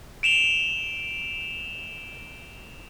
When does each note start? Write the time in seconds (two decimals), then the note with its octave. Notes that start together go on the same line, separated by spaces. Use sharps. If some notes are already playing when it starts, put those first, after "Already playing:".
0.23 D7 E7 F7 G7